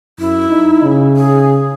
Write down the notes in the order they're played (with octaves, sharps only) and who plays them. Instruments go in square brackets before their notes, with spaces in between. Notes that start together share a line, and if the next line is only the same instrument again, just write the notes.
[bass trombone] F#2 [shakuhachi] E4
[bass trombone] D#4
C#3
[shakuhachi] G#4